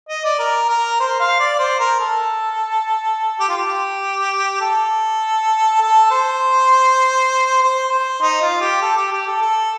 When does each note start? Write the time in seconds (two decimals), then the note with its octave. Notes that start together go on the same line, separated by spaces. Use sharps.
0.09 D#5
0.24 D5
0.39 A#4
0.69 A#4
1.00 C5
1.20 F5
1.40 D5
1.59 C5
1.80 A#4
2.00 A4
3.40 G4
3.49 F4
3.57 G4
4.61 A4
5.81 A4
6.11 C5
7.62 C5
7.91 C5
8.22 D#4
8.42 F4
8.61 G4
8.82 A4
8.97 G4
9.12 G4
9.27 A4
9.42 A4